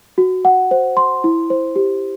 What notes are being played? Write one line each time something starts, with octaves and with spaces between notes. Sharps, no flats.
F#4
F#5
C5
C6
E4
C5
G4